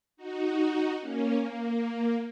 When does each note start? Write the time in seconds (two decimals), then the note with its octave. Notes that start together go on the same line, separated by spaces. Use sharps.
0.17 D#4 F#4
0.99 A#3 C#4
1.41 A#3